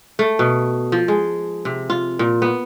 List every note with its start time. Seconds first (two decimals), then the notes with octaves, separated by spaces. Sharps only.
0.19 A3
0.39 B2
0.92 F3
1.08 G#3
1.65 C3
1.90 F4
2.19 A#2
2.42 B3